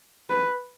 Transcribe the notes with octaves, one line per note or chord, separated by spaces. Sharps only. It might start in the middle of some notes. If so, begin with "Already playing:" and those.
B4